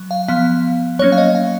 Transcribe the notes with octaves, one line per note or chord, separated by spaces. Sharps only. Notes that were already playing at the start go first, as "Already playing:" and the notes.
Already playing: F#3
F5
F3 B3 F5
F#3 A#3 C#4 C#5
F5
D#5
F5